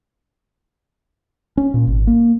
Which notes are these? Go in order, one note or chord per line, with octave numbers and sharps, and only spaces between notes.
C#4
A#2
G#1
A#3